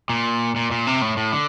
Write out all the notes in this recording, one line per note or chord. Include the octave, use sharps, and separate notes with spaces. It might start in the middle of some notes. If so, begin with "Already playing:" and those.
A#2
A#2
A#2
C3
A2
A2
D3